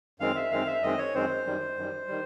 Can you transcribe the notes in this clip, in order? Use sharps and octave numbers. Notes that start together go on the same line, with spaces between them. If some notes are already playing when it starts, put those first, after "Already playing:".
F#2 D#3 G#3 C4 F5
E5
F#2 D#3 G#3 C4 F5
E5
F#2 D#3 G#3 C4 D#5
C#5
F#2 D#3 G#3 C4 C5
F#2 D#3 G3
F#2 D#3 G3
D#3 G3